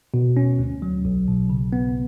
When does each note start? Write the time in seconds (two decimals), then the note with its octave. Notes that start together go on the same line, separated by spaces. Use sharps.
0.14 B2
0.37 C#4
0.59 D2
0.82 F#3
1.05 B1
1.28 B2
1.50 C#3
1.73 B3